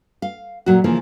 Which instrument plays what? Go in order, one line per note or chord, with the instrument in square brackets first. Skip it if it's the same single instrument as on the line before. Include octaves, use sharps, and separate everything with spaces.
[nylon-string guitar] F5
A#2 F#3 F#4
C#3 E3 F3 A#3